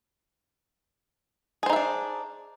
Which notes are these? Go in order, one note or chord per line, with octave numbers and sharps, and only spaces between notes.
D4 D#4 G#4 C5 E5